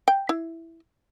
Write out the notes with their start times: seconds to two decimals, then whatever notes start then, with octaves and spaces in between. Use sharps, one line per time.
0.08 G5
0.29 E4